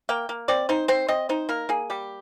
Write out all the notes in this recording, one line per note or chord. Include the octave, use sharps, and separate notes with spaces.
A#3 G5
A#3
C4 D5
D#4 C5
C4 C5
C4 D#5
D#4 C5
A#3 A#4
A#3 G#4
G3 G4